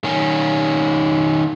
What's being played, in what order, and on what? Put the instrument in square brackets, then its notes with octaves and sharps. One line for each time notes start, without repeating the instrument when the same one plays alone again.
[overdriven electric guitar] D#3 C#4